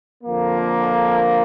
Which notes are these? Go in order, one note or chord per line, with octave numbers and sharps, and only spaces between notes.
F2 D3 F3 A#3